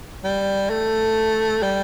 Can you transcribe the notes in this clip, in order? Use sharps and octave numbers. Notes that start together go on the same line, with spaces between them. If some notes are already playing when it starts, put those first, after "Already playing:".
G3
A3
G3